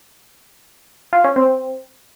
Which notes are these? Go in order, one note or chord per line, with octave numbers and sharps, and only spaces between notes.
F4
C#4
C4